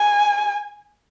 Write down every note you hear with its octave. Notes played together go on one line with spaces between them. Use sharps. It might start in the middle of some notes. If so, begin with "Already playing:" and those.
Already playing: G#5